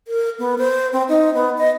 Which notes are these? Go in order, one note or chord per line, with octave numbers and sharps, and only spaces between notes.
A#4
B3
C5
C4
D#4
B3
D#5